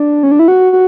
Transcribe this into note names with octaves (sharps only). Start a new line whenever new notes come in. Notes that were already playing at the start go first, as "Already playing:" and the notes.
Already playing: D4
C#4
D4
E4
F#4
F#4